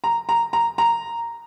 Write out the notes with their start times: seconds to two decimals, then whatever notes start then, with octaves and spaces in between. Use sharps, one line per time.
0.04 A#5
0.29 A#5
0.53 A#5
0.78 A#5